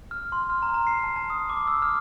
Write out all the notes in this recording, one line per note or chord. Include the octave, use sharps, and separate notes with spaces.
F6
C6
F6
A#5
A#5
C7
A5
A5
D#6
D6
E6
F6